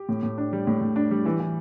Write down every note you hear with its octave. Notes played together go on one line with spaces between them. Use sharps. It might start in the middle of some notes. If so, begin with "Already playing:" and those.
Already playing: G4
A2
A2
D4
G3
A2
A2
D4
G3
E3
E3